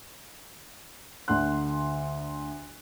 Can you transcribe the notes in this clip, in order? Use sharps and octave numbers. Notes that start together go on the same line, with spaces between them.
D2 D3 F#5 C6 F#6